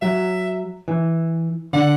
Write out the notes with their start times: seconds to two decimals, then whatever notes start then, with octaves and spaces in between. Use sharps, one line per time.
0.02 F#3 E5
0.88 E3
1.73 D3 F#5